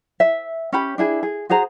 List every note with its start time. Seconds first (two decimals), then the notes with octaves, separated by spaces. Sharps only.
0.20 E5
0.72 C#4 G4 B5
0.98 D4 E4 G#4
1.23 G#4
1.50 F#4 G#4 C5 A#5